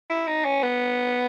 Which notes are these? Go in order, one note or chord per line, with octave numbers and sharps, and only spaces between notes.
E4
D#4
C#4
B3